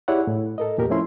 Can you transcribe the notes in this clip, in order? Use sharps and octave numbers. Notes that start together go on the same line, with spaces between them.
E4 G4 G#4 C#5 D5 F#5
A2
A4 A#4 D#5
E2 A#2 G4 A#4
F3 A3 C#4 E4 C6